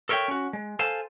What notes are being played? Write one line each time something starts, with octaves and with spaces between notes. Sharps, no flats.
A4 A#4 C#5 E5 G5
C#4 F#4
G#3
A4 C5 F5 G#5 A5